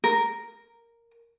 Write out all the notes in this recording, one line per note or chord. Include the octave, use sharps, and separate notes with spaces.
A#4